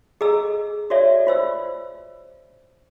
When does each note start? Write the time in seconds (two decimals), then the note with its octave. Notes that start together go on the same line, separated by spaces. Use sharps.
0.21 G#4 A4 D#5 A#5 E6
0.90 F#4 A4 C#5 D5 E5
1.27 F4 C5 E6